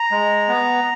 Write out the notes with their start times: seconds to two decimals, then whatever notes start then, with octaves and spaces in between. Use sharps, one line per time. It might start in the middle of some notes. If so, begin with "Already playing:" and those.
Already playing: A#5
0.11 G#3
0.48 B3